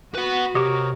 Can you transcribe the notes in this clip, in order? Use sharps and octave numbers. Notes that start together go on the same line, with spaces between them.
F#4 B4 F#5
C3 G4 A#4 C#5 D#5 D6